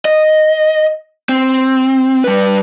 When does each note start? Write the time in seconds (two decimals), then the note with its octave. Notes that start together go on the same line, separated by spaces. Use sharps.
0.05 D#5
1.29 C4
2.24 G3 B4